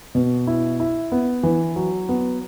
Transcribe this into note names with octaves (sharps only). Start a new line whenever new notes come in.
B2
E4
E4
B3
E3
F#3
B3